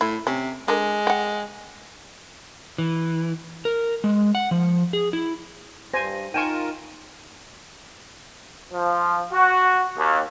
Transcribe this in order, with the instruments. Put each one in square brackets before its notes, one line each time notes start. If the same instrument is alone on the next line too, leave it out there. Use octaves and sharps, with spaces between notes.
[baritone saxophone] A2 [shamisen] E4
[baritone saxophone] C3 [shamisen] C#4
[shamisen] D3 A#4 [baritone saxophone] G#3
[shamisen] F#5 G5
[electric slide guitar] E3
A#4
G#3
F#5
F3
G#4
E4
[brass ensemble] G2 [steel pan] C5 G#5 [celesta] A#6 D#7
[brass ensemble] D#4 [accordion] F4 A#4 [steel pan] G5 G#5 C#6 [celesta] D#7 E7
[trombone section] F3
F#4
D#2